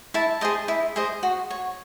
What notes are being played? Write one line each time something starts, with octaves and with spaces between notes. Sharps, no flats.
E4 A5
G#4 C5 D#5
E4
G#4 C5 D#5
F#4
C#5